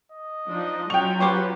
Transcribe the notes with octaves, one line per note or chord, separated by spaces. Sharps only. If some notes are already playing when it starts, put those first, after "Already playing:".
D#5
F3 D4 D#4
F#3 C#4 F4 G5 C#6 F7
G4 B4 C5 C#6